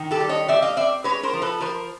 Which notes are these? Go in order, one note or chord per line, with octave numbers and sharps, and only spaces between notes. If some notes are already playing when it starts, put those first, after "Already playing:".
Already playing: D#3
G4 A4
G3
C#5 D#5
C4 D5 E5
D#5 F5
C4 D5 E5
G#3 B4 C#5
A#4 C5
F3
A4 B4
F3 A#4 C5